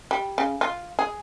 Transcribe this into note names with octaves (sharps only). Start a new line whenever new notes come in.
G3
C#3
F4
G#4